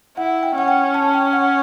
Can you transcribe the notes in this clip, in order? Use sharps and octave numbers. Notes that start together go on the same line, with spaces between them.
E4 F#5
G5
C#4 F#5
G5
A5
G5
F#5